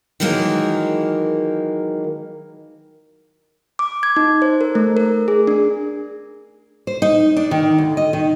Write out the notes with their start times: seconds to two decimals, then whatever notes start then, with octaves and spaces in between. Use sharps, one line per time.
0.20 D#3 E3 F#3 G#3 A#3
3.79 D6
4.03 G#6
4.17 D#4
4.42 C5
4.61 A#4
4.75 A3
4.97 A#4
5.28 G#4
5.47 D4
6.87 C5
7.02 D#4
7.37 D4
7.51 D#3
7.78 D2
7.97 D#5
8.13 D#3